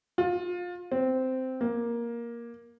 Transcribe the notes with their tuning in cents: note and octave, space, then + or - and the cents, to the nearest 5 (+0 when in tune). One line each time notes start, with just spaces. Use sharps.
F4 +25
C4 -10
A#3 +10